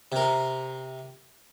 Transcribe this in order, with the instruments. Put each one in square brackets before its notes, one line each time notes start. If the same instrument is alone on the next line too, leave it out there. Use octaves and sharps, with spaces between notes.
[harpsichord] C3 A#4